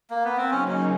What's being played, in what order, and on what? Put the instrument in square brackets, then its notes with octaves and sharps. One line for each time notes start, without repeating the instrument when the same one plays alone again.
[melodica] A#3
B3
C4
[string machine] C#3 F#3 A#3 D#4 [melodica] C#4
[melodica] C#4